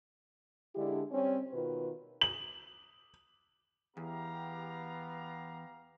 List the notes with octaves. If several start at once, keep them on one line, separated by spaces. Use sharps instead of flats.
D3 G#3 D4 E4 G4
G3 C4 C#4
B2 D#3 F4 B4
F#7
E2 B3 G4 F5 A#5